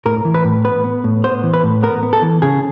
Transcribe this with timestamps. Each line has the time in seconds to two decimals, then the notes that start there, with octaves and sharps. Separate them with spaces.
0.06 A2 A#4
0.25 E3
0.34 B4
0.45 A2
0.65 B3 B4
0.84 B3
1.04 A2
1.24 B3 C5
1.43 E3
1.54 B4
1.63 A2
1.83 B3 A#4
2.03 B3
2.13 A4
2.22 E3
2.42 C#3 G#4